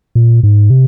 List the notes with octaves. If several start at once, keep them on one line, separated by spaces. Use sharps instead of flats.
A#2
G#2
C3